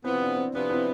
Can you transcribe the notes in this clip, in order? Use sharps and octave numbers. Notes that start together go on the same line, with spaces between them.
C3 F3 B3 C4 E4
D4
C4
C3 F3 B3 D4
C4 E4